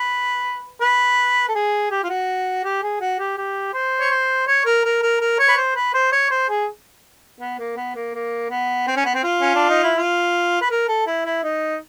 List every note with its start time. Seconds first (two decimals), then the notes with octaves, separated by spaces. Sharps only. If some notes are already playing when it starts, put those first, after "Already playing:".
Already playing: B4
0.81 B4
1.48 A4
1.55 G#4
1.91 G4
2.04 F4
2.09 F#4
2.64 G4
2.83 G#4
3.01 F#4
3.19 G4
3.37 G4
3.74 C5
4.01 C#5
4.10 C5
4.47 C#5
4.65 A#4
4.84 A#4
5.02 A#4
5.20 A#4
5.39 C#5
5.48 B4
5.57 C5
5.76 B4
5.94 C5
6.12 C#5
6.31 C5
6.49 G#4
7.40 B3
7.59 A#3
7.77 B3
7.95 A#3
8.14 A#3
8.50 B3
8.87 C4
8.96 C#4
9.05 B3
9.14 C4
9.24 F4
9.41 C#4
9.55 D4
9.69 D#4
9.83 E4
9.97 F4
10.61 B4
10.71 A#4
10.88 A4
11.07 E4
11.25 E4
11.43 D#4